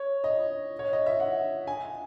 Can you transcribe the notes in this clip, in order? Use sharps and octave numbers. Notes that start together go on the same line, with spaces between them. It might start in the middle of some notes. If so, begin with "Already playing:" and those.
Already playing: C#5
D#5
C#5
D#5
E5
F#5
G#5